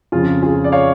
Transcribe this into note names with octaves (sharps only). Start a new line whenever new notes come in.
F2 C#3 F3 F4 G#4
F4 G#4
D5
C#5 F5